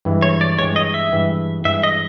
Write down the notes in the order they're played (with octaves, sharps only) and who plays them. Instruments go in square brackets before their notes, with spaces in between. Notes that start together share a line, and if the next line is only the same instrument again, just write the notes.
[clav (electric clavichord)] G2 E3 G#3
[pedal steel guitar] C#5
D5
[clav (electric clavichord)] G2 E3 G#3 [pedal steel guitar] C#5
[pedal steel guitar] D#5
E5
[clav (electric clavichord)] G2 E3 G#3
[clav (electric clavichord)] G2 E3 G#3 [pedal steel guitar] E5
[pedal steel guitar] D#5